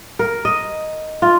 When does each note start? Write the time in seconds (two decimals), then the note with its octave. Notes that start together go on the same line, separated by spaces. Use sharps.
0.19 A#4
0.45 D#5
1.22 F4